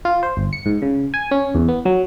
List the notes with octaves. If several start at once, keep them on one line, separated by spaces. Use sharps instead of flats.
F4
C5
G1
C#7
G#2
C#3
G#5
C#4
E2
B3
F#3